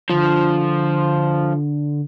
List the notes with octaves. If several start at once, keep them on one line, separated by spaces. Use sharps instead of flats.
D3 F3